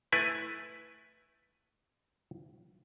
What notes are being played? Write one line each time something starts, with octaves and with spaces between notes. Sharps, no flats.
A3 E4 B4 G#5